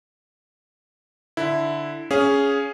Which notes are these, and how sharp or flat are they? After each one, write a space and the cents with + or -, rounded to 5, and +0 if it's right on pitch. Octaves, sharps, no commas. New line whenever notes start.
D3 +0 E4 +0
C#4 +10 G#4 +0 F5 +0